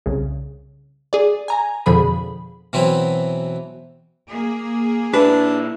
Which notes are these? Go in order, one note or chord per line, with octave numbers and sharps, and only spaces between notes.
C2 C#3
G#4 D5
G#5 A#5
F2 B2 D3 F3 G#4 B5
B2 E3 F#3 C4 E4
A#3 G#4
A#2 D4 E4 B4